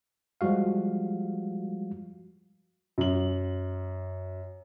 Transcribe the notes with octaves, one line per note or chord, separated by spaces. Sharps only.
F3 G3 G#3 F#4 F5
F#2 F#7